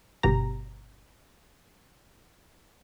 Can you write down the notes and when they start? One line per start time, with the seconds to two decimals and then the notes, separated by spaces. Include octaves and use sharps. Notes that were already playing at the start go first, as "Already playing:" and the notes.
0.23 G1 B2 G4 A#5